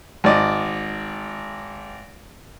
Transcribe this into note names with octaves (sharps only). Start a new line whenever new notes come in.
G#1 D5 D#5